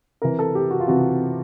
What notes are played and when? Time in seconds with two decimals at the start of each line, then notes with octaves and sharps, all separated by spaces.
0.22 C3 E3 A#4
0.39 A4
0.55 G4
0.70 F#4
0.80 F4
0.87 C3 E3 F#4